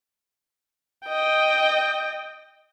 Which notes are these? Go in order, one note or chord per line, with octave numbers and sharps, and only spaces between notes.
D#5 G5